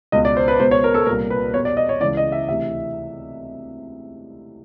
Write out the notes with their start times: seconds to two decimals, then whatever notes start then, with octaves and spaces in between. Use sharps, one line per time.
0.12 C#2 B2 D#5
0.25 D5
0.37 C5
0.48 B4
0.59 C#2 B2 C5
0.71 C#5
0.84 A#4
0.94 A4
1.06 C2 A#2 A#4
1.30 B4
1.53 E2 B2 C#5
1.65 D5
1.77 D#5
1.89 C#5
2.00 C#2 C#3 E3 D5
2.17 D#5
2.32 E5
2.48 D2 C3 E3 E5